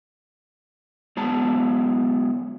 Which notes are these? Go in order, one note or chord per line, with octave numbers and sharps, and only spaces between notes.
F#3 G#3 B3 A5 A#5